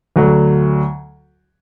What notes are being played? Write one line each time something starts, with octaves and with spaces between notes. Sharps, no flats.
D2 D3 F#3